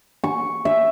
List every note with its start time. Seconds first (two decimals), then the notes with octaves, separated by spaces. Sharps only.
0.24 C#6
0.65 E5